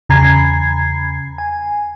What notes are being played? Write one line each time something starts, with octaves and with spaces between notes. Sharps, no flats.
E2 C#3 A#5 B5 G#6 C7
G#5